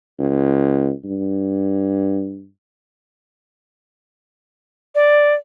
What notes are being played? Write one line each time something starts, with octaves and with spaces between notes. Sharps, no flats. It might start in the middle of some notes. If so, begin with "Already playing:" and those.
C#2
G2
D5